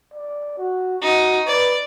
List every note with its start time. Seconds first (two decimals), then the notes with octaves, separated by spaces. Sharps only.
0.14 D5
0.58 F#4
1.02 D#4 F#4
1.47 B4 D5